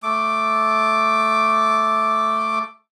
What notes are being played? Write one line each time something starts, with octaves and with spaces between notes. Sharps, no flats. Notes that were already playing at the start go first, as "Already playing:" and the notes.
A3 D6